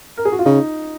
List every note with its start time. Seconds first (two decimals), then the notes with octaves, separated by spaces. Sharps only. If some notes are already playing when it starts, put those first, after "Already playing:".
0.17 A#4
0.25 G#4
0.32 F#4
0.39 F4
0.45 C#3 D#4